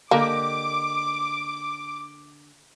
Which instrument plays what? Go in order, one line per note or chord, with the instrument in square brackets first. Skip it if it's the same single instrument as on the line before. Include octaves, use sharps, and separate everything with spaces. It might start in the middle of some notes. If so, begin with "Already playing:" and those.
[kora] D3 G4 D#5 [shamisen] A#3 [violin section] D6